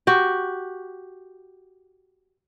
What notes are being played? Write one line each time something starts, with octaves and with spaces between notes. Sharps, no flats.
F#4 G4